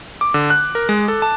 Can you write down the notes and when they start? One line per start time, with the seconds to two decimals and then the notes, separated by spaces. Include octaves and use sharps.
0.21 D6
0.34 D3
0.50 F#6
0.75 A#4
0.89 G#3
1.08 A4
1.22 A5